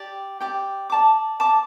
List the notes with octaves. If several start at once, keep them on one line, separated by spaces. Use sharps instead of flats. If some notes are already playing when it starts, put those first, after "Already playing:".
Already playing: G4 D5 G5
G4 D5 G5
D5 A5 D6
D5 A5 D6